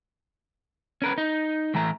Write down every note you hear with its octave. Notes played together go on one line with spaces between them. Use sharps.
C#4 A#4 B4
D#4
A2 E3 A3 A#5